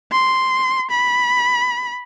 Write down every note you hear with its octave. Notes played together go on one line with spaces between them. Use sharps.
C6
B5